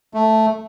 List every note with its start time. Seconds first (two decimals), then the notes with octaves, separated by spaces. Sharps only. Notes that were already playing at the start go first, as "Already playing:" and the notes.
0.14 A3